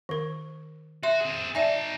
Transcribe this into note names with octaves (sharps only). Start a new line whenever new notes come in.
D#3 A#4
F#4 E5 C6
C4 G#4
D#4 D5 E5 G#5 A5